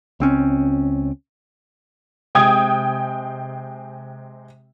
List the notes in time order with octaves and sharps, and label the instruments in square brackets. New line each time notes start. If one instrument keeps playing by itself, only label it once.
[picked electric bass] C#2 C4 C#4
[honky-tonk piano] C3 G#3 G5 D#6 G#6